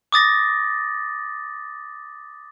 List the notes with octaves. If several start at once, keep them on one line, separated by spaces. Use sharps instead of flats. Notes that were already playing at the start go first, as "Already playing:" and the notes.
D6 D#6 A6 A#6